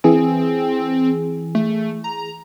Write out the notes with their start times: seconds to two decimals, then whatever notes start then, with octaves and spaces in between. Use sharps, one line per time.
0.04 E3 C4 G#4
1.55 A3
2.04 A#5